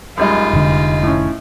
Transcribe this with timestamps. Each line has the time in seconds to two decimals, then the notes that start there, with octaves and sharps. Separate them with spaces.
0.17 F#2 G3 G#3 D#4 F4
0.53 F1 D3
1.03 A2 C#4